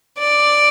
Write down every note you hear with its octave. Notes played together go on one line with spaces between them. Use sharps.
D5